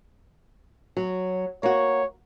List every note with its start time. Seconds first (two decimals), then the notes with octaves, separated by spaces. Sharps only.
0.97 F#3
1.63 A#3 F#4 C#5